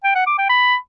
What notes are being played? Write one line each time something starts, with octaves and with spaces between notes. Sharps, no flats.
G5
F#5
D6
G5
B5